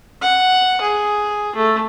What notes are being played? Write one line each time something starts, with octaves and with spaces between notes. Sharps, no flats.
F#5
G#4
A3